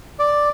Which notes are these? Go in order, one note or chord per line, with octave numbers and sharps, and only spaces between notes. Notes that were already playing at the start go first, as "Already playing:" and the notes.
D5